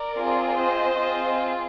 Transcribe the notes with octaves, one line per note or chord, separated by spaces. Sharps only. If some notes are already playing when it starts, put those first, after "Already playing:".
Already playing: A#4 D5
C4 F4 G#4
C5 D#5
C4 F4 G#4